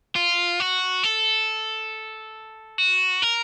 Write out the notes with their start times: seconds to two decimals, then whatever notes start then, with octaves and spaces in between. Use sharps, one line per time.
0.16 F4
0.60 F#4
1.03 A4
2.78 F#4
3.22 A#4